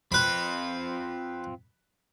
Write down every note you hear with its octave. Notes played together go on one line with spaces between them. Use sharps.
C4 F4 B4 B5